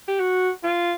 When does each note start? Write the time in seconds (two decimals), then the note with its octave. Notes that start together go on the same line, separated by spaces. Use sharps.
0.08 G4
0.20 F#4
0.64 F4